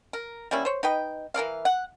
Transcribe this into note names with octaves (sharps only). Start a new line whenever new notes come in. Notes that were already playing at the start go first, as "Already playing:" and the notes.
A#4
G3 A#3 C#4 E4
C5 C#5
D#4 B4 D#5 G5
E3 A#4 D5 F5
F#5